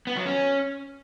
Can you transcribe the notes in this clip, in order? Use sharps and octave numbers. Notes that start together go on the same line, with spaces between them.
B3
F#3
C#4